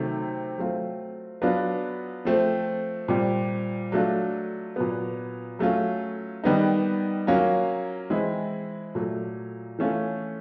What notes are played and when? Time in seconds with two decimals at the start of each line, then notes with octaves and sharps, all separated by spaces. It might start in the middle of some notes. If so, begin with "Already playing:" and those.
Already playing: C3 D#3 F#3 A3 C4
0.57 F#3 A3 C4 F4
1.42 F#3 B3 D4 F4
2.25 F3 A3 C4
3.08 A#2 G3 C4
3.92 F#3 A3 D4 F4
4.76 A#2 F#3 B3
5.59 F#3 A3 C#4 F4
6.44 D#3 G3 B3 D#4
7.27 F#3 A#3 C#4 F4
8.10 E3 G#3 C4 E4
8.95 A#2 F#3 A3
9.79 E3 A3 C#4 F4